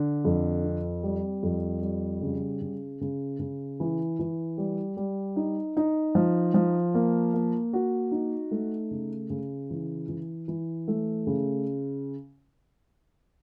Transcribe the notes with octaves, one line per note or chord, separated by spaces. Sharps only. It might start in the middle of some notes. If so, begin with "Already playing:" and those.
Already playing: D3
F2
C4
G3
F2
G3
C#3
C#3
C#3
C#3
E3
E3
G3
G3
D#4
D#4
F3
F3
A#3
A#3
F#4
D#4
A3
C#3
C#3
E3
E3
E3
A3
C#3